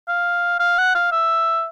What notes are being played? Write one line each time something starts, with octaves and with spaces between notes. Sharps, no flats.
F5
F5
F#5
F5
E5